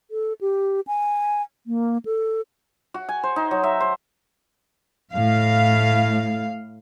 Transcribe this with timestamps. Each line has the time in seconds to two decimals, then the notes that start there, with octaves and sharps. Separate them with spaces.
0.11 A4
0.41 G4
0.87 G#5
1.67 A#3
2.05 A4
2.94 F#4
3.09 G#5
3.23 C5
3.36 D#4
3.51 F#3
3.63 E5
3.80 C5
5.14 A2 F5